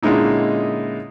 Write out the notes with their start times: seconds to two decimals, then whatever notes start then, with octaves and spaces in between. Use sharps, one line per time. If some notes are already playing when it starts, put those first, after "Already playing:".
0.03 A#2 D3 G#3 C#4 D#4 E4